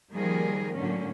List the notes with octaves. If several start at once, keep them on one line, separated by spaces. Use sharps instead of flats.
D#3 F3 G3 A#3 G#4 A#4
A2 D3 F#3 A#3 C#4